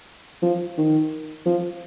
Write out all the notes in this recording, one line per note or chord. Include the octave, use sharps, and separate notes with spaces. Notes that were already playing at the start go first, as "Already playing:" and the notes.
F3
D#3
F3